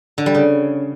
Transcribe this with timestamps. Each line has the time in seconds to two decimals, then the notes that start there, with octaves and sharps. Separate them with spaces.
0.18 D3
0.26 G3
0.35 C#3